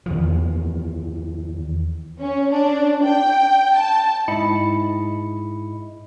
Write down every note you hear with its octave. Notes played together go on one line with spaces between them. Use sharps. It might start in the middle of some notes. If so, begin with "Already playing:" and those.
E2 D#3 F3
C#4
D4
G5
A5
G#2 E4 D#5 B5 C#7